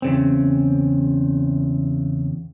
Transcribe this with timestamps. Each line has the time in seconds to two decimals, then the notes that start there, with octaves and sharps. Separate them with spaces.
0.02 E2 C#3 C4